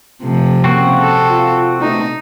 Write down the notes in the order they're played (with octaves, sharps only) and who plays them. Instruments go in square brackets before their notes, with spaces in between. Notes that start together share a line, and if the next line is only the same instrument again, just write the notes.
[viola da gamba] C3 F3 [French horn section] A3
[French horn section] C#3 A#3 [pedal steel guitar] C4 F#4
[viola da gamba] A4
[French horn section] F4
[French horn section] B2 A3 [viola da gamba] D#4